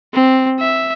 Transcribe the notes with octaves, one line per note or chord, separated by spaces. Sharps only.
C4
E5